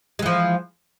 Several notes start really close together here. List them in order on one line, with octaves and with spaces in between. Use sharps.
G#3 E3 F3